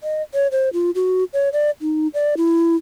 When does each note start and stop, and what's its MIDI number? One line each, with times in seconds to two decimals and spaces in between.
0.03 0.22 75
0.34 0.47 73
0.52 0.69 72
0.73 0.91 65
0.95 1.24 66
1.33 1.49 73
1.53 1.70 74
1.81 2.07 63
2.14 2.34 74
2.37 2.76 64